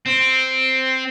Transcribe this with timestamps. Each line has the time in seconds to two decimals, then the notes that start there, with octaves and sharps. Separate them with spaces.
0.06 C4